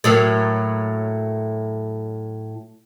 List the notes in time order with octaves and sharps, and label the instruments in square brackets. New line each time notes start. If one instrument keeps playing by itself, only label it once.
[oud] A2 F#3 A#3